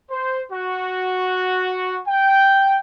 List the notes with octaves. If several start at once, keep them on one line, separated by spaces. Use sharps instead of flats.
C5
F#4
G5